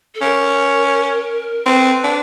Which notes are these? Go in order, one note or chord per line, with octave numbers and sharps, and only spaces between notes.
A4
C#4 A#4
C4 B4
D4